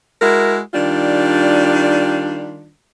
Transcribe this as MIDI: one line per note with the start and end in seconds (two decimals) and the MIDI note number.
0.22 0.59 56
0.22 0.59 64
0.22 0.59 66
0.22 0.59 70
0.74 2.71 51
0.74 2.71 55
0.74 2.71 62
0.74 2.71 65